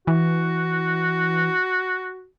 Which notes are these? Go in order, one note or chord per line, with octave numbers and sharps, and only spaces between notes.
E3 F#4